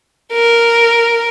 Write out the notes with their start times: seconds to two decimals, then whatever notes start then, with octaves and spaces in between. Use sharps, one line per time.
0.33 A#4